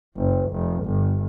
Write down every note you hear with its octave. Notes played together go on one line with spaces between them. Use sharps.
F#1
F1
G1